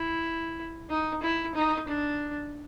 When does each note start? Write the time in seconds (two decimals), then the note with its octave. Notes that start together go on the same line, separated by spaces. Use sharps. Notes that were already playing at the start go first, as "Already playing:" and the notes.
Already playing: E4
0.90 D#4
1.22 E4
1.55 D#4
1.88 D4